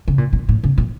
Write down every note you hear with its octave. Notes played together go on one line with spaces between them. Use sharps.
C#3
A#2
A#2
A2
C#3
A#2